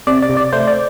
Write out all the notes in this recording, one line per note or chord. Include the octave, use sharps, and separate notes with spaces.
C3 D5
D5
C3
D5
A3 C5
D5